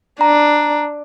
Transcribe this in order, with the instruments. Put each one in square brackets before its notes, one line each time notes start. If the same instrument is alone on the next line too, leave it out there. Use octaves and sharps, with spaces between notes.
[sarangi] D4 [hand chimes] A#5